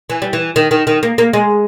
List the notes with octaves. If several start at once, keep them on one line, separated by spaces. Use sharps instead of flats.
E3
G3
E3
D#3
D#3
D#3
A#3
A#3
G#3